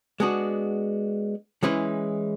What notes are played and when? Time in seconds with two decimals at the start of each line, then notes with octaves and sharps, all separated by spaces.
0.20 G#3 B3 D4 F#4
1.63 E3 G#3 C#4 E4 B4